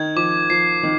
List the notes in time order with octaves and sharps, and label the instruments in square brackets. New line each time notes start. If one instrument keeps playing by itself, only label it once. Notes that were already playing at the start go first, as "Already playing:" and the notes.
Already playing: [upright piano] D#3 [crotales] G#6
[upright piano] F3 [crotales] D6
[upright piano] F3 [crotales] C7
[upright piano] D#3